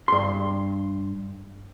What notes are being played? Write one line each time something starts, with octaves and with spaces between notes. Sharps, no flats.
G2 C6